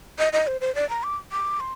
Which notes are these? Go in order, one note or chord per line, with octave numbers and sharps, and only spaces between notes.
D#5
D#5
C5
C5
D5
A#5
D6
D6
C6